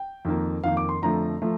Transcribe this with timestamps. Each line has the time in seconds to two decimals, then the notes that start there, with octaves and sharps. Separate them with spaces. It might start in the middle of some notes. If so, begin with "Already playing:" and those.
Already playing: G5
0.25 F2 D#3 A#3
0.64 F2 D#3 A#3 F5
0.77 D6
0.89 C6
1.02 F2 D3 F3 A3 A#5
1.42 F3 A3